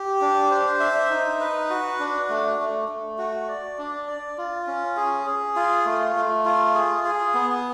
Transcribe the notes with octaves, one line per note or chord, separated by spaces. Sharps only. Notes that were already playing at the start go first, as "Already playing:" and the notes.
Already playing: G4
D4
C5
E5
D#4
B4
F#4
D4
A3
A3
A3
F#4
D5
D4
D5
F4
C#4
G#4
G#4
F4
A3
A3
F4
G#4
G#4
B3